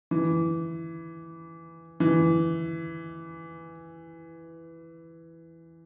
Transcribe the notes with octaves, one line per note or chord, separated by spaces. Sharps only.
E3
E3